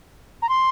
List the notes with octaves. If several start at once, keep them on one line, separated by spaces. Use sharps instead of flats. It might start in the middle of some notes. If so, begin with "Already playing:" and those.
A#5
C6